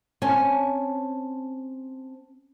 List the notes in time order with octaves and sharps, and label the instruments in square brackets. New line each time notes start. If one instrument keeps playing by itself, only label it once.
[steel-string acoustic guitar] C4 G#5 A5 [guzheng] C#4